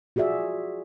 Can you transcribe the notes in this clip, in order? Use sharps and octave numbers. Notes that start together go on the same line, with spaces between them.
F4 F#4 G#4 D5 E5